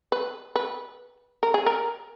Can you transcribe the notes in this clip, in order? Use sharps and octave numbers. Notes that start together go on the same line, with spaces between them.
B4
B4
A#4
G#4
A#4